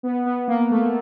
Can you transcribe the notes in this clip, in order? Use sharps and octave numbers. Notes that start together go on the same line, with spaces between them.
B3
B3
A#3
A3